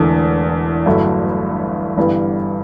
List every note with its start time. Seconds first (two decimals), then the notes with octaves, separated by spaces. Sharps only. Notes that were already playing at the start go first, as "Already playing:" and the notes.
Already playing: E1 E2 D3 A3
0.86 G1 G2 F#3 A3 E4
1.97 G1 G2 E3 G3 B3